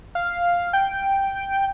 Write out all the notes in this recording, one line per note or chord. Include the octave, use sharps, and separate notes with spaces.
F5
G5